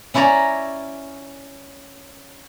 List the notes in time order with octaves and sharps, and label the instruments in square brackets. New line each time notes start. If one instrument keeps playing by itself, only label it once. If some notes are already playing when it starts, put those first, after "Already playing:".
[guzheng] C#4 E4 C#5 D5 A#5